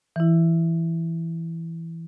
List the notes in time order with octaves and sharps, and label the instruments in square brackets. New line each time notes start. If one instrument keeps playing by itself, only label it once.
[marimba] E3 E4